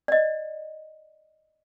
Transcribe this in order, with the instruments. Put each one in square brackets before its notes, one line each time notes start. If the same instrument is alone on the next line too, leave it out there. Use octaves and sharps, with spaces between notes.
[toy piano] D5 D#5